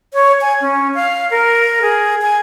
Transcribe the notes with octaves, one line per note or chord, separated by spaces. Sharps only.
C#5
G#5
C#4
F5
A#4
G#4
G#5